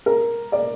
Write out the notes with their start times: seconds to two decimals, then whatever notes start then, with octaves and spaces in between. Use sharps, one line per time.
0.06 A#4
0.52 D5